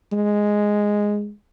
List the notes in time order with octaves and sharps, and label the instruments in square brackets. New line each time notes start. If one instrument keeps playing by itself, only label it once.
[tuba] G#3